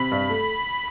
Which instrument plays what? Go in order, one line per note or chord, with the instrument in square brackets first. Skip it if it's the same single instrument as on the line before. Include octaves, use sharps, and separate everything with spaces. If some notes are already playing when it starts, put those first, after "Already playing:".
Already playing: [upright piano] C3 [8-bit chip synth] B5
[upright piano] G2
A3